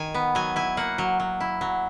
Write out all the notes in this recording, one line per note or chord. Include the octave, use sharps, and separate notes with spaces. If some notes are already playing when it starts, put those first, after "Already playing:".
Already playing: D#3 G#5
B3
F#3 G#5
E4 G#5
A#3 F#5
F#3
F#3
E4
F#3